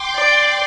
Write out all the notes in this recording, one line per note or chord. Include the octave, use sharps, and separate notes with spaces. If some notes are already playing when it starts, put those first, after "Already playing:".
Already playing: G5 C6 D6
D5